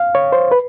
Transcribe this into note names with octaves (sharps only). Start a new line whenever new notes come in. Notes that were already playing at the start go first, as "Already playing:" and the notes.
Already playing: F5
C#5
C5
B4